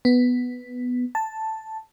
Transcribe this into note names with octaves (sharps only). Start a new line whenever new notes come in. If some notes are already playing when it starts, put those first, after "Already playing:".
B3
A5